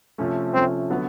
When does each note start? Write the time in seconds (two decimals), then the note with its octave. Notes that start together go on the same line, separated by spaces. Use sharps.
0.18 C3 F3 A3 C#4
0.54 C3 F3 A3 C4 C#4
0.90 D3 F#3 B3